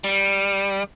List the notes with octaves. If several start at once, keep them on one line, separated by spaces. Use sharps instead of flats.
G3